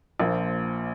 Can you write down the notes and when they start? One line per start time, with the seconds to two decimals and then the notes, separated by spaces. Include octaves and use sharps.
0.20 A#1 A#2 F3 A#3